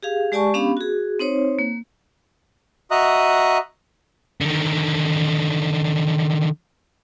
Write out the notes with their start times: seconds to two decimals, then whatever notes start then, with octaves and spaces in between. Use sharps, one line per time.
0.03 G4 G#4 F5
0.32 G#3 G4 D5 G#5 A5 C#6
0.54 B3 C#4 D4 G4 F5 B5
0.77 F#4 G#4
1.19 C4 D#4 C5 C#5
1.59 A#3
2.91 F#4 D#5 E5 A#5 D#6 F#6
4.41 D3 D#3